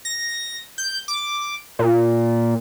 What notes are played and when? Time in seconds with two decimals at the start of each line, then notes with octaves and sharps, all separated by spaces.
0.05 A#6
0.78 G6
1.08 D6
1.79 A#2